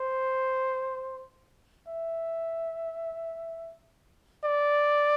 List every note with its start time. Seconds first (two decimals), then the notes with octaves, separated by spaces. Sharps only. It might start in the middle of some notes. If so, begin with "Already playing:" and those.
Already playing: C5
1.88 E5
4.45 D5